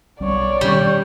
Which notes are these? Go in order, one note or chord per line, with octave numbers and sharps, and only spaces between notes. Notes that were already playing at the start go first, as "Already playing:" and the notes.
B1 G3 C#4 C#5 D5
B2 D#3 G3 C#4